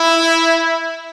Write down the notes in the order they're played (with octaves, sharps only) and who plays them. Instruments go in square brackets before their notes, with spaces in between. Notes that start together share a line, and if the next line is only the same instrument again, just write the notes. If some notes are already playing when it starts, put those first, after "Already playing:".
Already playing: [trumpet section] E4